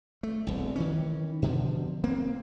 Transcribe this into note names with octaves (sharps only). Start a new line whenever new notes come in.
A3
E1 C2
D#3 E3 C#4
B2 D3 F3
A#3 C4